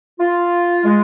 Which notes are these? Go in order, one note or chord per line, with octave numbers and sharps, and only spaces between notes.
F4
G#3